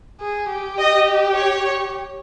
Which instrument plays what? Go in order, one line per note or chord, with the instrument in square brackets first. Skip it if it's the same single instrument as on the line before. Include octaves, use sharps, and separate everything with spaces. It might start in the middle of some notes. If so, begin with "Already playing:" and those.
[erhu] G#4
G4
[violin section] D#5
C#5